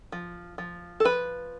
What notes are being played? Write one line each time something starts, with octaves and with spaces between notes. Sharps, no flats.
F3
F3
A4
F3 B4